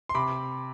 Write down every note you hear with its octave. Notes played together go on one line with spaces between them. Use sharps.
C6
C3 B5 D6